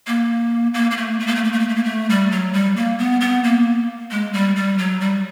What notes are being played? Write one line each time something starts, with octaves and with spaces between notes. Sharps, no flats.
A#3
A#3
A#3
A3
A3
A#3
A3
A#3
A3
A#3
A3
A#3
A3
G3
F#3
G3
A#3
B3
B3
A#3
G#3
G3
G3
F#3
G3